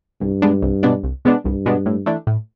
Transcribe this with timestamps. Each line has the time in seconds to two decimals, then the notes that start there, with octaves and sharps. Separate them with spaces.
0.21 C2 G2
0.42 B2 G#3 B3 D4
0.62 C2
0.83 B2 G#3 B3 D4
1.03 C2
1.25 B2 G#3 B3 D4
1.45 C2 G2
1.66 B2 G#3 B3 D4
1.86 A2
2.06 E3 A3 D4
2.27 A2